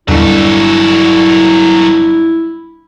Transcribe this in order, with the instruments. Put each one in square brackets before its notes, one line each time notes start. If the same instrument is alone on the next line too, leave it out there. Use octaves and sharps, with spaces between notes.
[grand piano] G1 [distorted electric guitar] F#3 A4 [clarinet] E4